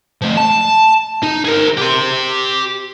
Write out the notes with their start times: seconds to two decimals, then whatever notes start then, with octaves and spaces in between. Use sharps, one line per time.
0.22 F3 A3
0.37 A5
1.23 D#4
1.45 G#4 A#4
1.77 G4 C6